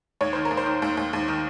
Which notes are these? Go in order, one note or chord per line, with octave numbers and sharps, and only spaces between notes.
D#2 C#5
D#3 C5
A#4
D#2
C5
D#3
D#2
D#2
D#2
D#3